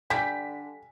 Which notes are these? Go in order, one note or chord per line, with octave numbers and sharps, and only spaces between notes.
D3 G3 G#5 B6